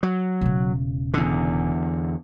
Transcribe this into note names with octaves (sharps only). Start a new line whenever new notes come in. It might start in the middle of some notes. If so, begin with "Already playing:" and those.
F#3
E1 C#3
E2 D3